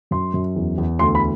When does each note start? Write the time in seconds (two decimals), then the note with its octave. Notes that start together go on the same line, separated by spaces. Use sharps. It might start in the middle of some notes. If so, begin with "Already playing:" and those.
0.11 F#2 C6
0.34 F#2
0.56 E2
0.78 E2
0.99 D2 C6
1.15 B5